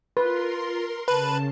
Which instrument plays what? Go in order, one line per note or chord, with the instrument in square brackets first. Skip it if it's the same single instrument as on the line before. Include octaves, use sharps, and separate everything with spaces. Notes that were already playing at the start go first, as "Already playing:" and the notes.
[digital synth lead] F4 [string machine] A#4 C6 [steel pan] B4
[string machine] C#3 [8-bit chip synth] B4 [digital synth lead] A5